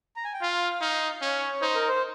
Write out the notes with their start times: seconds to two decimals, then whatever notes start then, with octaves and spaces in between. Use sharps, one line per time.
0.16 A#5
0.24 G#5
0.34 G5
0.41 F4 F5
0.81 D#4
1.21 C#4 C#5
1.61 D#4 C5
1.75 A#4
1.88 C5